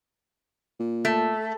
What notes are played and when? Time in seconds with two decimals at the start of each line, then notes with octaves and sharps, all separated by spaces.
0.80 A#2
1.05 A3